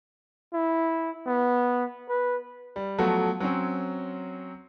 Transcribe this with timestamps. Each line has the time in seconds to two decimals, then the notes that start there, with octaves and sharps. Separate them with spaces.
0.53 E4
1.26 B3
2.09 B4
2.76 G3
2.98 F3 F#3 A3 B3 F#4
3.40 F#3 C4 C#4